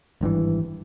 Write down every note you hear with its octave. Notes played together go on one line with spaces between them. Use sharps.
G#1 G2 B2 E3